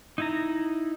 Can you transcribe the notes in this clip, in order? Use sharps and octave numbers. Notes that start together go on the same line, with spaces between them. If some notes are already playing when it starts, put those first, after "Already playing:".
D#4 E4 A#5